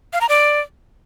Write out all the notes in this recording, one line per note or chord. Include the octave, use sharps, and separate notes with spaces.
F5
A#5
D5